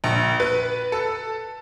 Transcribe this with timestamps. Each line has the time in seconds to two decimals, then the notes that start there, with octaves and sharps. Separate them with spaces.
0.04 A#1
0.40 B4
0.92 A4